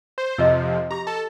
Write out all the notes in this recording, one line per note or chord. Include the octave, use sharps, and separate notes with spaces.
C5
F2 C3 F3 D#5 E6
G4 A#5 D6
A4